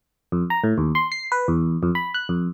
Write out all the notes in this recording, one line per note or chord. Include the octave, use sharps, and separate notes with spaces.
F2
A#5
A2
D#2
C6
C7
B4
E2
F2
B5
F#6
F2